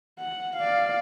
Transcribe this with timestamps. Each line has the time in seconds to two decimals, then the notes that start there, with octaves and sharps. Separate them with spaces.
0.19 F#5
0.56 D5 F5